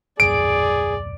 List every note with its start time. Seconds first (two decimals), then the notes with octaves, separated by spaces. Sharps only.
0.20 D#1 B1 F#2 G#4 D5 D7